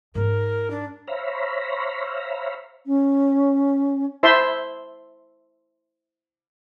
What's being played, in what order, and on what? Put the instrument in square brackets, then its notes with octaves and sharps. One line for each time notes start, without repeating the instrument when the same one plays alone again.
[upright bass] G#2 D#4 [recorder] A#4
[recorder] D4
[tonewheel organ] C5 C#5 E5 F5 A#5 B5
[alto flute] C#4
[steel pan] E4 C5 E5 A5 C6